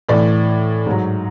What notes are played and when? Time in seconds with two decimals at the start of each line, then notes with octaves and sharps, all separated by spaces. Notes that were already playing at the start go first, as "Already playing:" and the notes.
0.09 A2 E3 D5
0.86 G#2 F#3